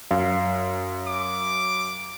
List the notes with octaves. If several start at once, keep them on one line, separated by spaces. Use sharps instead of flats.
F#2 F5
D6